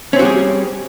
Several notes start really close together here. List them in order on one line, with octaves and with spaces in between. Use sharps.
C#4 C4 F#4 G3 G#4